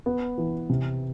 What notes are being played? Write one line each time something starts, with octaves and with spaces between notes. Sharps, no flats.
B3
E3
C3